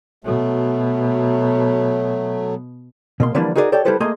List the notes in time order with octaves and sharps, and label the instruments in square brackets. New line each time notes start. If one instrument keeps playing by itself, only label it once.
[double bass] B2 [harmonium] F#3 A3
[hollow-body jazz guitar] B2 A#3 C6
D3 E3 F3 G3 A#3 D4
D#4 F#4 G#4 A#4 B4 D5
G4 A4 C#5 D5 G5
G3 E4 G4 A4 B4 C5
A3 A#3 G#4 D#5 A#5 C6